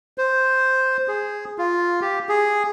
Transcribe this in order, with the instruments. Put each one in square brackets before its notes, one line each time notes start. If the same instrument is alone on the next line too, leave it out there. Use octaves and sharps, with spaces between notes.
[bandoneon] C5
G#4
F4
G4
G#4